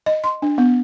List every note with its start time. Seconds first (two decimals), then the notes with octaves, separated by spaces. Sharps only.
0.06 D#5
0.24 C6
0.42 D4
0.58 B3